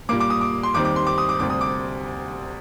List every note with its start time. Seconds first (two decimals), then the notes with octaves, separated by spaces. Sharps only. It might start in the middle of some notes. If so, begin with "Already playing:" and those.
0.09 A#2 G3 A#3 D6
0.20 D6
0.30 D#6
0.41 D6
0.63 C6
0.74 D#2 D#3 G3 C4 D6
0.85 D6
0.96 C6
1.07 D6
1.18 D#6
1.29 D6
1.39 D2 C3 G3 C4 D6
1.50 D#6
1.61 D6